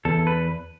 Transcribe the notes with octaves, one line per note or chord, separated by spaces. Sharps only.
E2 A4
B4